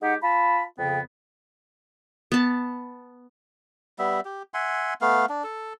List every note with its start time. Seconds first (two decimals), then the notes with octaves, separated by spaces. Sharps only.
0.02 G#3 D#4 G4 F#5
0.23 F4 A5 B5
0.79 F2 C#3 B3 G5
2.32 B3 A5
3.99 G3 B3 E5
4.25 G4
4.54 E5 F#5 G#5 C6
5.01 A3 B3 F5
5.29 D4
5.44 A4